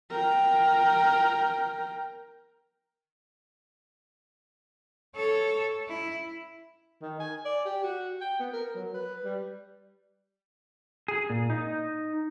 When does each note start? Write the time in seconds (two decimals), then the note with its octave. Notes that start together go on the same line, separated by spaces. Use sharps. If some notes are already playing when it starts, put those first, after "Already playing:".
0.11 A#4 G5
5.16 A4 C#5
5.88 E4
7.02 D#3
7.20 G#5
7.45 D5
7.65 G4
7.83 F#4
8.21 G5
8.40 B3
8.53 A#4
8.75 F#3
8.94 B4
9.24 G3
11.08 G#4
11.30 A#2
11.50 D#4